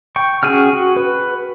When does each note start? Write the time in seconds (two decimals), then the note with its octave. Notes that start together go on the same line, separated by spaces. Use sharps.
0.16 G5 C#6
0.43 C#4 F#4 G#4 G5 F6
0.73 F#4
0.96 B4